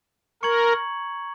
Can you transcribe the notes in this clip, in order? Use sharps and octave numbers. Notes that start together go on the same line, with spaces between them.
A#4 A#5 C#6 G#6 C#7 F#7